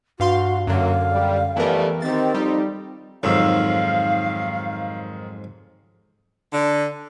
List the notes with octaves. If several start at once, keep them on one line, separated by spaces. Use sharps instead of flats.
G2 F#4 F5 C6
F#2 D3 F#3 A#3 F5
G3
F2 E3 G3 A3 B3 A#4
D#3 C4 G4 A6
F2 G3 D#4 G4
F2 G#2 D#3 F#3 F5 E6
D3